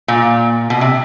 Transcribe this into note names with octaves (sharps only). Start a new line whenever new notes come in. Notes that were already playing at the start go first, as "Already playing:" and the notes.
A#2
B2
C3